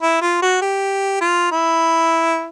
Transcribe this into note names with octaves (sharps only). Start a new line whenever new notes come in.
E4
F4
F#4
G4
F4
E4